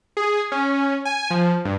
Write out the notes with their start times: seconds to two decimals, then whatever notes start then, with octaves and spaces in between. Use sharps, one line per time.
0.17 G#4
0.52 C#4
1.05 G#5
1.30 F3
1.65 G2